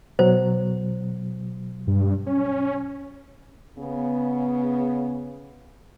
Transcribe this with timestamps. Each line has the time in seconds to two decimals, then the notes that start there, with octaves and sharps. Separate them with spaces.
0.19 B2 F#3 C5
1.87 G2
2.26 C#4
3.78 C#3 B3